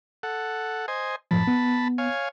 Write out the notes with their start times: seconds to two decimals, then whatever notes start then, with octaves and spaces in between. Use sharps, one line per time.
0.23 A4 F#5
0.88 C5 D#5 G#5
1.31 F#2 A2 F3 A5 B5
1.47 B3
1.98 C#5 F5 G#5